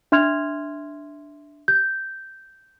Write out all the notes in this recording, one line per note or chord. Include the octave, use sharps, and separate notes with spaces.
D4 E5 C6 F6 G#6 F7
G6